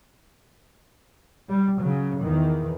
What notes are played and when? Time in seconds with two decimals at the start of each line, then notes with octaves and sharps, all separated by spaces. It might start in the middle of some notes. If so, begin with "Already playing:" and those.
1.49 G3
1.80 C#3 F#3
2.22 E2 D#3 E3